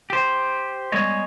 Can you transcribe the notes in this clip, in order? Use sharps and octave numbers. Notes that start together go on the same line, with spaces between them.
G4 C5
G3 G#3 B3 C#5 D#5